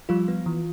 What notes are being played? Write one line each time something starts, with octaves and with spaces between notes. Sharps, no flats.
F3 G3 F4
B3
E3